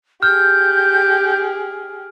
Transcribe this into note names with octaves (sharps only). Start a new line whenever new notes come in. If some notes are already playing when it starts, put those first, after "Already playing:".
G4 G#4 F6 G6